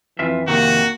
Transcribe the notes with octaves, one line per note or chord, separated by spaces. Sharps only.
F2 E3 F4 E5
F2 C3 D#3 A#3 F#4